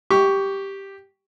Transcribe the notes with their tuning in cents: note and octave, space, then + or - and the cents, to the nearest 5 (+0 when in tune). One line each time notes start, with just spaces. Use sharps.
G4 +0 C#6 +15